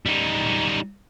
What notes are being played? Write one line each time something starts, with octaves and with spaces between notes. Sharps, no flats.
G3 D#4